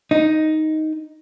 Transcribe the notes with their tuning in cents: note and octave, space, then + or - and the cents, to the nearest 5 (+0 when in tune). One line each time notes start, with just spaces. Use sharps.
D#4 +5